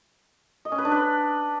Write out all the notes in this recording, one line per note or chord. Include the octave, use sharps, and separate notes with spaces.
D#5
C#4
B4
D4
B4